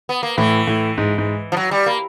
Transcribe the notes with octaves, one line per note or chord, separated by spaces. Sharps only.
B3
A#3
A2 E3
A2
G#2
G#2
F3
F#3
G3
A#3